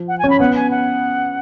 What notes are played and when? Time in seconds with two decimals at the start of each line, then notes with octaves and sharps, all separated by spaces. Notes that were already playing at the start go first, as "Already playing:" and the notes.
Already playing: F3
0.08 F#5
0.19 G#5
0.24 C#4
0.30 B5
0.40 B3 F#5
0.56 G#5
0.71 F#5